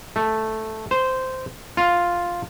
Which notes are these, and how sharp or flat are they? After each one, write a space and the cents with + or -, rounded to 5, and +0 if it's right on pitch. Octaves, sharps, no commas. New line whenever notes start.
A3 -5
C5 -10
F4 +0